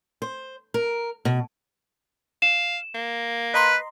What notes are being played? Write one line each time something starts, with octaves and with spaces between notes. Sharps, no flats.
C5
A#4
B2
F5 E7
A#3
B4 D#5 A#5 C6